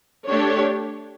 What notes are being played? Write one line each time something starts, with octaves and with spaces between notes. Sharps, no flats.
A3 D4 G4 C#5